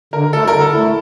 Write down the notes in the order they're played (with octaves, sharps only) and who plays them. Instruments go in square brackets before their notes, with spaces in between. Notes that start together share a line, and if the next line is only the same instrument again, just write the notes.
[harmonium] D3 [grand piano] A#4
[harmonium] A3 E4 [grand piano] A4
[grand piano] A#4
[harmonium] D3
[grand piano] A4
[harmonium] A3 E4